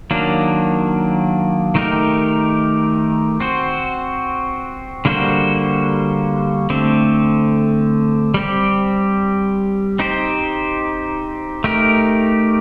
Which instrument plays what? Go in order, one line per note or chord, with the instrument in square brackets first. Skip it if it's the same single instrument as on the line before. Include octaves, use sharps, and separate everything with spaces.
[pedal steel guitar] D#3 F#3 A#3 D4
D#3 A3 D#4 G4 A#4
C4 F#4 C5
D3 G3 A#3 F#4 C5
D3 A3 C4
G3 C4 G4
C4 D#4 G4 C5
A3 D#4 G4 A#4